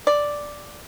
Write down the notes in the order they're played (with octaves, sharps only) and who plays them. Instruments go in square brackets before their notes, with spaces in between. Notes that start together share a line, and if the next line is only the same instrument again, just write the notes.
[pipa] D5